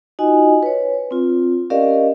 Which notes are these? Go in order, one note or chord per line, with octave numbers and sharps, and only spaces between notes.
D#4 F4 F#4 D#5 G#5
B4 C#5
C4 F4
C#4 G4 A#4 D5 D#5 F5